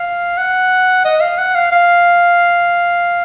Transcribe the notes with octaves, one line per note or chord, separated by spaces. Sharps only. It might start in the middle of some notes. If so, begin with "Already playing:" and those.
Already playing: F5
F#5
D#5
F5
F#5
F5
F5